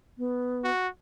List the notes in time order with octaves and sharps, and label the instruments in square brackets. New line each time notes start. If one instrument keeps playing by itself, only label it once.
[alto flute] B3
[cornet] F#4